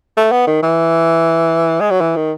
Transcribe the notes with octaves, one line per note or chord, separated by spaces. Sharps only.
A3
B3
D#3
E3
G#3
F#3
E3
D#3